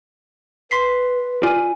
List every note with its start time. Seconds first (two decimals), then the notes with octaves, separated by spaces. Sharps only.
0.71 B4 C6 B6 C7
1.43 F4 D5 G#5 D#7